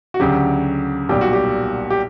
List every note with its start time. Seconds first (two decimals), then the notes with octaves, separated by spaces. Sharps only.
0.14 F#4
0.20 D2 C#3 F#3 G4
1.09 B1 A#2 G3 G4
1.21 F#4
1.33 G4
1.90 G4